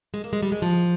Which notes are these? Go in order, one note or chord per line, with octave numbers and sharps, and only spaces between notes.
G#3
A#3
G#3
G3
G#3
F3